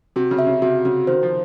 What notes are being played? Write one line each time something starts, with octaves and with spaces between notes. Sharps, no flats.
C3 F#4
C#3
E5
C#3
C3 F#4
C#3 F#4
D#3 C5
F3